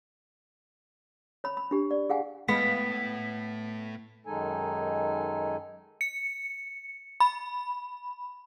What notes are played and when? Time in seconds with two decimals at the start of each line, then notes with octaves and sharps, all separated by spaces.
1.44 C#5 B5
1.57 B5
1.71 D4 G4
1.91 D5
2.10 G#4 F5 F#5 G#5
2.48 A2 G#3 B3 F5 B5 B6
4.26 F#2 D#3 G#3 D#4 A4 G#5
6.01 C#7
7.20 B5